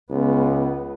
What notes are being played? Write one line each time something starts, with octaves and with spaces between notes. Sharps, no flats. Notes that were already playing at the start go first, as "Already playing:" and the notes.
C#2 B3